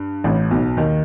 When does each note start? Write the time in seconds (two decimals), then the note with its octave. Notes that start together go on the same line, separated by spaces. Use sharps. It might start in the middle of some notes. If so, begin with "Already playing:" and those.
Already playing: G2
0.24 A1 A2
0.51 B1 B2
0.77 D#2 D#3